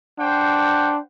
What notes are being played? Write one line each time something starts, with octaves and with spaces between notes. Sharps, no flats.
D4 C5 F#5 G5